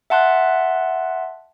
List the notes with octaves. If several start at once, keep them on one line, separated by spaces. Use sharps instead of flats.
E5 F#5 A5 C6 F#6